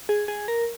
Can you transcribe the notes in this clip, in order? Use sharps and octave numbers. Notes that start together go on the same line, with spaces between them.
G#4
G#4
A#4